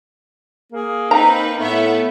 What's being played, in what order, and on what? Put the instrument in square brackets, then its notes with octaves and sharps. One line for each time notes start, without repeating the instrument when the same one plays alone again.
[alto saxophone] A#3 [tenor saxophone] G#4
[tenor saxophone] C4 [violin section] D#4 B4 [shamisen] A#5
[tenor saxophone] A2 [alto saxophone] A3 [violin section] B3 E5